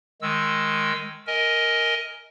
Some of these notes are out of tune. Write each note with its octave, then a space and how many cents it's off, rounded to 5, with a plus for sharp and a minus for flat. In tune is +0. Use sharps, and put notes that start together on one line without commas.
D#3 +0 G#3 +0 E6 +0
A#4 +0 D#5 +15 G#5 +0